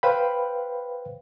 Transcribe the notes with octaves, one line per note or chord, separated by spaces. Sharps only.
B4 C5 F5 G5 B5